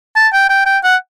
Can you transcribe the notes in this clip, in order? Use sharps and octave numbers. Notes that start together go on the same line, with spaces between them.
A5
G5
G5
G5
F#5